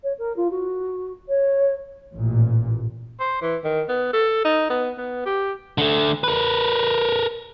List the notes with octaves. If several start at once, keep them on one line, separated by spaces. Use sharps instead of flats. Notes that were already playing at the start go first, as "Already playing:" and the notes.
C#5
A#4
F4
F#4
C#5
A1 A#2
C5
E3
D#3
B3
A4
D#4
B3
B3
G4
D3 A3
A#4 B4